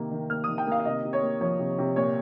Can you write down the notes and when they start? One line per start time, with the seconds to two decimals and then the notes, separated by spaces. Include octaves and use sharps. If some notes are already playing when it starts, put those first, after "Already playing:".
Already playing: C3 D#3 A#3
0.11 D#3
0.30 A#3 F6
0.44 D#3 D#6
0.58 G5
0.67 A#3 F5
0.80 F5
0.85 C3 D#5
1.04 C3
1.13 C#5
1.22 A#3
1.41 F3 C#5
1.60 C3
1.79 C3
1.96 A#2 C#5